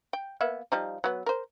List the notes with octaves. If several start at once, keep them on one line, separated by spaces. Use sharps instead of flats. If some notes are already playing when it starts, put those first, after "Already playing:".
G5
A#3 B3 E5
F3 G3 D#4
F#3 B3
A#4 C5